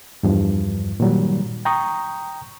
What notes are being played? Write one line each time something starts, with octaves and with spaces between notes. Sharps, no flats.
E2 G2 F3
A#2 D#3 F#3 G3
G5 A#5 C#6 D#6